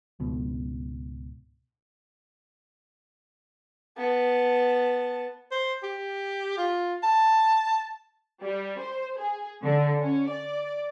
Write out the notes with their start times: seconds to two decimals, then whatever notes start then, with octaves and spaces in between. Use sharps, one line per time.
0.20 C#2 G#2 B2
3.97 B3 A5
5.51 C5
5.83 G4
6.57 F4
7.03 A5
8.43 G3
8.81 C5
9.19 G#4
9.62 D3
10.02 C#4
10.30 D5